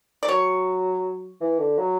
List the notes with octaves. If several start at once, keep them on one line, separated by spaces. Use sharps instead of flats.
D5
F#3 C#5
E3
D3
F#3